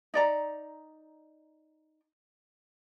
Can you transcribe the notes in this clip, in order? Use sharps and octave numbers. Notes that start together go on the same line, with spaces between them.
D#4 D5 A#5